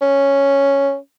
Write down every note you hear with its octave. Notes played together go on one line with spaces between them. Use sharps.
C#4